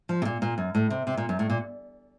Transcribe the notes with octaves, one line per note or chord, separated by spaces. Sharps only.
F3
C3
A#2
A#2
F#2
A2
C3
C3
A#2
F#2
A2
A#2